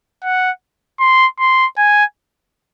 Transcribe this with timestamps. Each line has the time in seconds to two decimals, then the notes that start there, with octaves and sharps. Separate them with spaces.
0.24 F#5
1.00 C6
1.39 C6
1.78 G#5